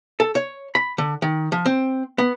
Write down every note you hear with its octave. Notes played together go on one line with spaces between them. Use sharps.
A4
C#5
B5
D3
D#3
F3
C4
B3